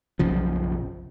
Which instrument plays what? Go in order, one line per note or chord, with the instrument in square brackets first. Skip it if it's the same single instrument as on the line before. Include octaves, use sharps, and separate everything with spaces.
[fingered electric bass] F#1 B1 C#3 F3